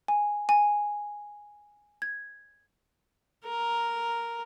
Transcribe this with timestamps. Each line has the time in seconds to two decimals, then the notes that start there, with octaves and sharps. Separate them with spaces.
0.08 G#5
0.49 G#5
2.02 G#6
3.45 A#4